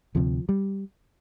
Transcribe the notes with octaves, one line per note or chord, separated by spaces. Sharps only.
D2 C3 F3
G3